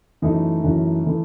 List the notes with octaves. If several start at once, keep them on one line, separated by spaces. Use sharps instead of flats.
F#2 E3 A3 D#4
F#2 E3 A3
E3 A3